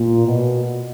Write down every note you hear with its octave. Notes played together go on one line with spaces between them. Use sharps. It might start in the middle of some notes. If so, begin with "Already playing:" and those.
Already playing: A#2
B2